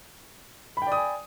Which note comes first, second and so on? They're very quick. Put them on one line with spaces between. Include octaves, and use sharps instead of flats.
B5 G5 D5 D#6 G#5